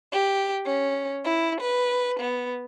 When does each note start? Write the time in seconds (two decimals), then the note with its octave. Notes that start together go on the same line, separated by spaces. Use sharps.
0.13 G4
0.66 C#4
1.25 E4
1.61 B4
2.20 B3